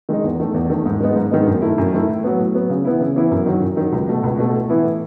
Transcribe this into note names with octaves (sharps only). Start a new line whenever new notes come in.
D#3 G#3 D#4
E2
D#3 A3
E2
D#3 A3
G#2
D#3 G#3 B3 D#4
G#2
D#3 G#3 B3 D#4
F#2
D#3 A3 E4
F#2
D#3 A3 E4
A2
F#3 B3
A2
F#3 B3
C#3
E3 B3 E4
C#3
E3 B3 E4
F#2
D#3 F#3
F#2
D#3 F#3
C#2
B2 A3
C#2
B2 A3
A2
E3 B3 E4
A2